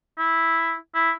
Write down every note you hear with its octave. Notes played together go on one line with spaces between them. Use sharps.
E4
E4